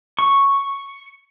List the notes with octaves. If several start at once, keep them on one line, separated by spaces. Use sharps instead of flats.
C#6